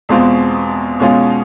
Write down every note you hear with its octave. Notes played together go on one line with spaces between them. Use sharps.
E2 B2 G#3 C4 F4
B2 G#3 C#4 F4